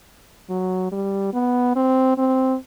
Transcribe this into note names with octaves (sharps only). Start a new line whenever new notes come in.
F#3
G3
B3
C4
C4